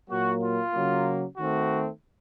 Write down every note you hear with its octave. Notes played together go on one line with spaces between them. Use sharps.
A#2 F#3 A#3 F#4
F4
C#3 F#3 A#3
D#3 A3 C4 F#4